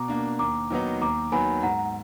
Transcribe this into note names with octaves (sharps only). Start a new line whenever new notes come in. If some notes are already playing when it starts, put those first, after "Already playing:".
Already playing: B2 A#5 D6
A#3 D4
D#2 A#5 D6
D#3 F#3 B3 D#4
D#2 A#5 D6
D#3 F#3 B3 G#5 B5
G#2 F#5 A#5